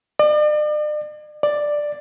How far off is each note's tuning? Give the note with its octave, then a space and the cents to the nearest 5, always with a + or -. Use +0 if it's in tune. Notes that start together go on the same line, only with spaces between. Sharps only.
D5 +40
D5 +5